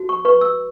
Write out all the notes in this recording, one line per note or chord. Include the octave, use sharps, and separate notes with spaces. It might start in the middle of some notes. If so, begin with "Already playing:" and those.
Already playing: F#4
C#6
B4 C#6
E6